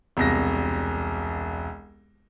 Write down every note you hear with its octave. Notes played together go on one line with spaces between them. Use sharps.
E1 C2 A#6